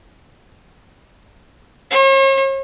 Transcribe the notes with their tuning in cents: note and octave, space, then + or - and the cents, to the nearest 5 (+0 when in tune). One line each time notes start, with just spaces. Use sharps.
C#5 -45